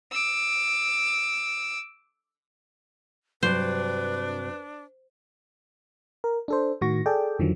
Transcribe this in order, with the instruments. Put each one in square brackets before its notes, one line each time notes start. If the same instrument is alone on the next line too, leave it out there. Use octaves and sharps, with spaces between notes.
[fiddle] D6 E6
[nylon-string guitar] G2 C3 F#3 [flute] D4 [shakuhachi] B4 [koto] C5
[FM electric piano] A#4
D4 A4 C5
A2 D#3 F#4 C#6 A#6
G#4 A4 D5 G5
F2 D3 D#3 F3 F#3